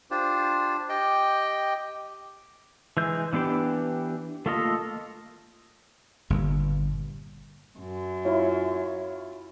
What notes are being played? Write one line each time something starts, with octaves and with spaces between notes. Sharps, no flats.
D4 F4 G4 C5
G4 D#5 G5
E3 G#3 G6
E3 B3 D4 G4 G5
A3 A#3 F4 A4 D#5
G1 G2 A#2
F#2
E4 F4 C#5